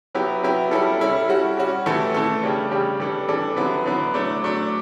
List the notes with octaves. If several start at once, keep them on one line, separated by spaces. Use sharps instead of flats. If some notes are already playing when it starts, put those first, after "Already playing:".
F#3 B3 E4 G4
F#3 B3 E4 G4
G3 C#4 E4 A4
G3 C#4 E4 A4
G3 C#4 F#4
G3 C#4 F#4
E3 A3 E4 A4
E3 A3 E4 A4
C#3 G3 D4 G4
C#3 G3 D4 G4
E3 G3 D4 A4
E3 G3 D4 A4
D3 F#3 B3 E4
D3 F#3 B3 E4
F#3 A3 D4
F#3 A3 D4